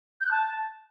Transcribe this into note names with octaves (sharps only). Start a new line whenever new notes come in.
G6
F#6
A5